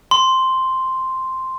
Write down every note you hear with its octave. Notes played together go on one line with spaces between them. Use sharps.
C6